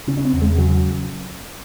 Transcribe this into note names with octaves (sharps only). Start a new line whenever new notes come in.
C#3 C#4
C#4
C4
E2
G#3
C#3 F#3